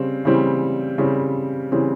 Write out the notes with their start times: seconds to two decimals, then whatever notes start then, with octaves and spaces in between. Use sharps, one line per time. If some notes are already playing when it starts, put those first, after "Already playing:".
Already playing: C#3 G3 C4
0.25 C#3 E3 G3 C4
0.98 C#3 E3 G3 C4
1.71 C#3 E3 G3 C4